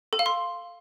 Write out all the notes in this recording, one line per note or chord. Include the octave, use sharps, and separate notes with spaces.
A4
F5
C6